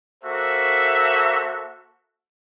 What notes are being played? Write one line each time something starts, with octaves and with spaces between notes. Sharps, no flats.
A#3 F#4 A4 C5 E5